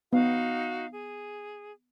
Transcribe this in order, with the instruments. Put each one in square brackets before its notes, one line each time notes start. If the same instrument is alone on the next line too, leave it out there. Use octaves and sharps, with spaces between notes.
[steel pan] B3 [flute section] D#4 F#4 F5
[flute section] G#4